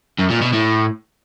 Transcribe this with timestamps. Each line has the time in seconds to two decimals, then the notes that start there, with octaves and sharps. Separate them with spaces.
0.19 F#2
0.30 A#2
0.41 B2
0.53 A2